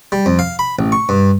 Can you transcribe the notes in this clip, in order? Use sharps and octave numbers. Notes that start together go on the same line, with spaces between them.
G3
F2
F5
B5
A1
C#6
G2